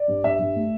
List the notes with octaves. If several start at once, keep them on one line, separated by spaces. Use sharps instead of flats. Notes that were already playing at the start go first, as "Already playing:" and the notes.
Already playing: D5
G2
G2 E5
G2
A3